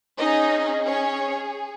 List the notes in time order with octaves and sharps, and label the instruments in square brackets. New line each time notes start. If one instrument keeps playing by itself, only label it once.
[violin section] C#4 D#4 G#4 D#5
C#4 C#5